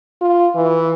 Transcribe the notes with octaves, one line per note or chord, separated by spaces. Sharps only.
F4
E3